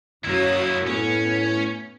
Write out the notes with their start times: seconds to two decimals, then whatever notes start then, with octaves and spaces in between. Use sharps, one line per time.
0.24 F#2 F#3 A#3 E4 D#6
0.86 A2 B3 C#4